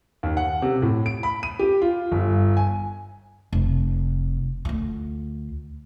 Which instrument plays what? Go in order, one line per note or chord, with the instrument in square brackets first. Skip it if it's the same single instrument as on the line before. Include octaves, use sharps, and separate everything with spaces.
[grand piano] D#2
F#5
C3
A2
D7
B5
D#7
G4
F4
G1
G#5
[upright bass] F1
D2 F4